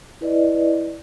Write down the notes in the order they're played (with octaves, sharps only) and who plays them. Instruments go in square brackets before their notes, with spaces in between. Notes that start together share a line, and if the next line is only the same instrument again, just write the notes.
[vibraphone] E4 B4 D5 D#5